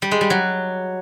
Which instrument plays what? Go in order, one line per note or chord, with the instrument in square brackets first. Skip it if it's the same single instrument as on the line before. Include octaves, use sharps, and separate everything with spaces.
[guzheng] G3
G#3
G3
F#3